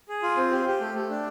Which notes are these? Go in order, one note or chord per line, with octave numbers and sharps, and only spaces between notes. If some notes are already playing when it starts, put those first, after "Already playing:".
G#4
F4
C4
G4
G4
A3
A3
D4